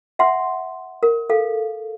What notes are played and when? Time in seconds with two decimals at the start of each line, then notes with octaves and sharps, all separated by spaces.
0.19 E5 F#5 C6
1.03 A#4
1.30 A4 F5